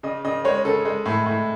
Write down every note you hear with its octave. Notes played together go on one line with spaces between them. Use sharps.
C#3 D#5
C#3 D#5
G#3 C#5
C#3 A4
G#3
A2
A2